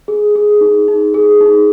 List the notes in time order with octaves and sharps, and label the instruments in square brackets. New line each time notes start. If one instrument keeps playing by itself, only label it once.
[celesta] G#4
G#4
D#4
D#4
G#4
D#4